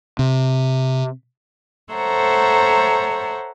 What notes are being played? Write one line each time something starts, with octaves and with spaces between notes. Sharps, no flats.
C3
A4 C5 C#5 E5 F#5 A#5